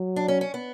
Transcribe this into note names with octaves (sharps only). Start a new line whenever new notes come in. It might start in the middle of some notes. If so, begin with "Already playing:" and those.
Already playing: F#3
D4
C#4
C#4
B3